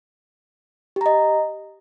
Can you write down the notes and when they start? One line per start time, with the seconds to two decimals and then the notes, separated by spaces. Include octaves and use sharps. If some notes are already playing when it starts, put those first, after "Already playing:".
0.96 G4
1.01 A#5
1.06 D#5